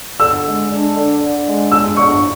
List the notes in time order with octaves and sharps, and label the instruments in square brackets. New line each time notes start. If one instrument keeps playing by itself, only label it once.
[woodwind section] D3 [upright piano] E6
[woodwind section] G#3
D4
D3
D3
G#3
[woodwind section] D4 [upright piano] E6
[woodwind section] D3 [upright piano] C#6